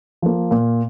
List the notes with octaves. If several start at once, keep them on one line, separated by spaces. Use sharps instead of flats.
F3 A#3
A#2